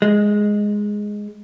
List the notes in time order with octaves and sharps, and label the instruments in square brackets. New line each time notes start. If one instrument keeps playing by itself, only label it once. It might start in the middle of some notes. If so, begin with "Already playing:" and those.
[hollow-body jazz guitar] G#3